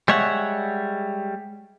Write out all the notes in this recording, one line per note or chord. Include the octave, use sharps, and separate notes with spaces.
G3 G#3 C#5 E5 F#5